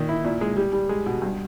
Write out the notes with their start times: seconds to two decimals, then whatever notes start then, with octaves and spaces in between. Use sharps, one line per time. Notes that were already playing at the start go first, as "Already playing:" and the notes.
Already playing: A#2 D#3
0.09 E4
0.25 A#2
0.41 G#3
0.57 G3
0.73 G3
0.89 G#3
1.06 B2
1.22 G2